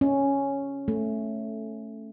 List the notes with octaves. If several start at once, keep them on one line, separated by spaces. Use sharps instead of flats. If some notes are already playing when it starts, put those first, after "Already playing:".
C#4
A3